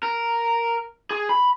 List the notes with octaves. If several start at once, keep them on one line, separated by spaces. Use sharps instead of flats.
A#4
G#4
B5